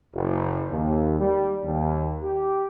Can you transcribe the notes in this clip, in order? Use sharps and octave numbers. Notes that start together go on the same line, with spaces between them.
F#1
D#2
G3
D#2
G4